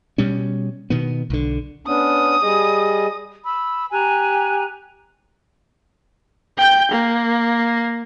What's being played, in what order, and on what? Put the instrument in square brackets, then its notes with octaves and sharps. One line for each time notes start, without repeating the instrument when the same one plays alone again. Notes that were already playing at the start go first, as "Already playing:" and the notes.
[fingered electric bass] B2 G3 C#4
B2 D#3 B3
B1 D3
[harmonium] B3 C#4 D4 [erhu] D#6
[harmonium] G3 G#4 D#5
[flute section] B5 E6
G4 G#5 A#5 F#6
[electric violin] G5 G6
A#3